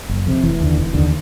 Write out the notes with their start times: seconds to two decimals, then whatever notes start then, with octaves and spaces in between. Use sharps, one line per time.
0.09 F#1
0.27 F2 C3
0.43 F1 E3
0.61 D#2 D3
0.78 F1
0.94 D#2 D3